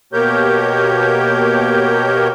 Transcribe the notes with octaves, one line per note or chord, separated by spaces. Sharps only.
B2 A#3 G4 A#4 C#5 G6